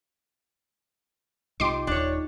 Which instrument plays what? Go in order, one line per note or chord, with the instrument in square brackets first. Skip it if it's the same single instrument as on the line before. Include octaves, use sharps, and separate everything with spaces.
[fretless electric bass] C2 [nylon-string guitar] D#4 F4 G4 [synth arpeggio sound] C6 D6
[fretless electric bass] D#1 [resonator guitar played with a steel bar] D4 C#5